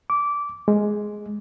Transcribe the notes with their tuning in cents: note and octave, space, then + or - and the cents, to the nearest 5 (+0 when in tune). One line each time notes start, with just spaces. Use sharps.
D6 -15
G#3 +5